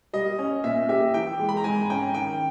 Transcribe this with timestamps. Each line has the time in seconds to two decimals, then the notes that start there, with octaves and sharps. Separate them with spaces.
0.13 G3 D#5
0.39 C#4
0.64 A#2 E5
0.89 G4 E5
1.14 E3 G5
1.39 G#3
1.49 B5
1.57 A#5
1.64 G#2 G#5
1.90 C#4 G5
2.14 D#3 G5